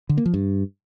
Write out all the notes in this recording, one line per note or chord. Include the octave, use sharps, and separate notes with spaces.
D3
A#3
F3
G2